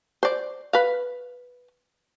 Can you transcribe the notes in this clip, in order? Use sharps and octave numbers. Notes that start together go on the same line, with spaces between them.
C5 D5
B4 F5